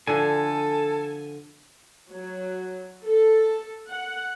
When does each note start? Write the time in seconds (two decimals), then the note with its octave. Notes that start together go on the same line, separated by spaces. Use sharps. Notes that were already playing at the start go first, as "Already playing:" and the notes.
0.07 D3 F3 A4 G#5
2.10 F#3
3.06 A4
3.88 F#5